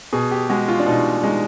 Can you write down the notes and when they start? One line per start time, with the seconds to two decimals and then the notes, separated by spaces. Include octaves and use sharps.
0.13 B2 G#4
0.31 G4
0.49 G#3 F#4
0.68 F4
0.79 D4
0.86 B2 D#4
1.23 G#3 D#4